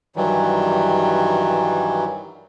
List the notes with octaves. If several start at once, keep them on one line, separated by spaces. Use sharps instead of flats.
G2 D#3 E3 F#3 G3